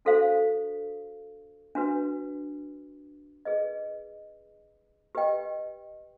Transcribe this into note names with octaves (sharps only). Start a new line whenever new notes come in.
D4 F#4 A4 C5 F5
D4 F#4 B4
G#4 B4 D#5
G4 B4 D#5 G5